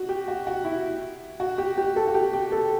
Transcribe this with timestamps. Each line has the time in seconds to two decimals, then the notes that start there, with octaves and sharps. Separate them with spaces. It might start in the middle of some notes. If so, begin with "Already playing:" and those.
Already playing: F#4
0.09 G4
0.28 F#4
0.47 F#4
0.64 E4
1.40 F#4
1.58 G4
1.78 G4
1.96 A4
2.07 F#4
2.14 G4
2.33 G4
2.52 A4